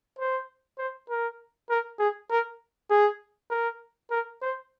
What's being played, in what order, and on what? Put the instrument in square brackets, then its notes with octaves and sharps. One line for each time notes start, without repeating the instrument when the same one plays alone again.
[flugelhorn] C5
C5
A#4
A#4
G#4
A#4
G#4
A#4
A#4
C5